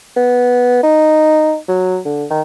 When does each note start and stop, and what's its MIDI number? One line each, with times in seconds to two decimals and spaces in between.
0.17 0.79 59
0.83 1.57 63
1.69 1.98 54
2.05 2.25 50
2.30 2.42 51